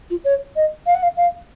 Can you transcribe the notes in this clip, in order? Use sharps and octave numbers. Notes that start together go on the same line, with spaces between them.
F4
C#5
D#5
F5
F#5
F5
F5